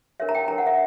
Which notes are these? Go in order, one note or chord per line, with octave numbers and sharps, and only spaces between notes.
D4 A#4 C#5 E5
A#5
G5
D4 A#4 C#5 A#5
F#5
E5